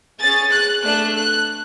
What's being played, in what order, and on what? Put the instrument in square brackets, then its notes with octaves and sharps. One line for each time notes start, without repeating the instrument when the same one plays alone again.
[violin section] C#4 G#4 A6
F#6
A3 D4 A4 F#6
F#6